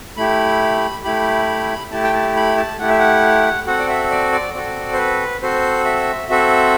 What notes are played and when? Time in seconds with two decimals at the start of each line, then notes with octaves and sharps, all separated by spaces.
0.17 A3 E4 G4 B5
1.04 A3 E4 G4 B5
1.92 A3 E4 G4 A5
2.03 G5
2.13 A5
2.36 B5
2.57 A5
2.79 A3 E4 G4 F#5
2.89 E5
2.99 F#5
3.67 C4 F#4 A4 F#5
3.79 D5
3.89 E5
4.11 D5
4.32 D5
4.54 C4 F#4 A4 D5
4.93 C5
4.98 B4
5.42 C4 F#4 A4 C5
5.85 E5
6.29 C4 F#4 A4 E5